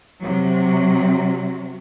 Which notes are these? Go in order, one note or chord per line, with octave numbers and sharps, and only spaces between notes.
C3 F#3